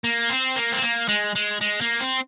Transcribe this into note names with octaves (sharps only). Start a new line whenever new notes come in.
A#3
C4
A#3
C4
A#3
G#3
G#3
G#3
A#3
C4